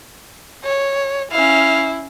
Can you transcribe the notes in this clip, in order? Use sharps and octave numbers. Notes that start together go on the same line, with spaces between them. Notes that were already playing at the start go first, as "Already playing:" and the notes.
C#5
C#4 E4 F5